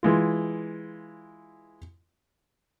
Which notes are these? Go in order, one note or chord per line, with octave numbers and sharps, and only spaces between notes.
E3 G#3 F4